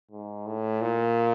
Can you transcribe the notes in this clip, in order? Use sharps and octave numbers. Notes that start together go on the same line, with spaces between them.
G#2
A2
A#2